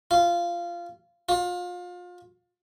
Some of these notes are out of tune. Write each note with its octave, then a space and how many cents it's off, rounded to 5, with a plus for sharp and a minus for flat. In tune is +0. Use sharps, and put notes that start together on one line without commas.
F4 -15
F4 +30